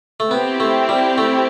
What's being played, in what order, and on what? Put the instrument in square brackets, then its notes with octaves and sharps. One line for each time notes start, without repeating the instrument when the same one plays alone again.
[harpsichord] A3
[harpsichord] B3 [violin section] C4 E4 G4
[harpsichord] A3
G3
A3